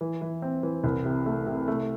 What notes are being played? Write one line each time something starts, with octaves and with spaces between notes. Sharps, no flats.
E3
E3
C4
E3
C2
C3
A3
C3
A3